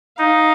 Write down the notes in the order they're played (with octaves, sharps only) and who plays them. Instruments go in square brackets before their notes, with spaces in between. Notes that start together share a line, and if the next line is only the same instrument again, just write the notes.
[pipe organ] D#4 [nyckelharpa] F5